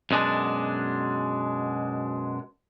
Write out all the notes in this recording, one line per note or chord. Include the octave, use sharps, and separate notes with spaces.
F#2 B2 G#3 D4